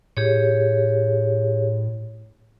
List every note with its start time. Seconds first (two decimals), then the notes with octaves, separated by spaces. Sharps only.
0.17 A2 G4 G#4 C#5